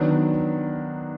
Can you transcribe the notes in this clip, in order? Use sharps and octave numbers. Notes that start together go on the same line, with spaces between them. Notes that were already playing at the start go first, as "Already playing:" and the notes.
Already playing: D#3 F#3 B3 D4